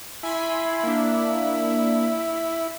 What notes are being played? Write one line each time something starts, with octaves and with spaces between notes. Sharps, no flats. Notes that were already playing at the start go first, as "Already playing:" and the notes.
E4 G#5 B5 C6
A#3 D4